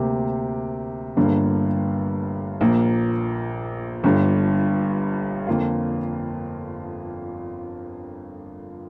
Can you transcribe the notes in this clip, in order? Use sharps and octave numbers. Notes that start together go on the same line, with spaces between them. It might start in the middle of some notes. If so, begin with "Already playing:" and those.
Already playing: D2 C3 A#3 G4
G1 G2 D3 A#3
A#1 A#2 A#3
G1 G2 D3
F2 D3 A#3 F4